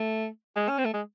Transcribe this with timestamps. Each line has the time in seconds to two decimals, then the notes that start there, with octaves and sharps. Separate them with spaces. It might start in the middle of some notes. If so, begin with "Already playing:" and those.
Already playing: A3
0.56 G#3
0.69 C#4
0.78 C4
0.85 A3
0.93 G#3